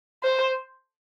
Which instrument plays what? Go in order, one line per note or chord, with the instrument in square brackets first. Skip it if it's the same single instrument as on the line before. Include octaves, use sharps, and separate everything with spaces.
[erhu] C5